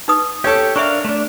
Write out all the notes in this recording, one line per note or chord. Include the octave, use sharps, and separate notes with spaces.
D#4 B4 D#6
G4 A4 C#5
D4 A#4 E5 F5 C#6
A3 D4